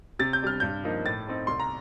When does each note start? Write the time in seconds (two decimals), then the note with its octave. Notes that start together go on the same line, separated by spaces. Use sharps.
0.19 C3 A6
0.33 G6
0.42 G3 D4 F6
0.60 G2 G6
0.84 F3 A#3 D#4
1.06 A2 A6
1.27 A3 C4 D#4
1.47 C2 C6
1.60 A#5